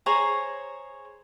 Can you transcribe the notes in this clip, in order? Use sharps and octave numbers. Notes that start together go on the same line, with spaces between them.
G#4 C5 C#5 A#5